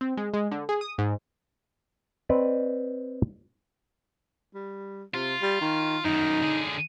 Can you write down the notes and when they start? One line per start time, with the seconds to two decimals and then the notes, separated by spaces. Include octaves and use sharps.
0.01 C4
0.17 G#3
0.34 G#3
0.51 D3
0.69 G#4
0.81 D#6
0.98 G#2
2.29 C4 B4 D5 D#5
4.55 G3
5.14 C3 F4
5.42 G3
5.61 D#3
6.04 F#2 D#3 D#4
6.42 D3 G#4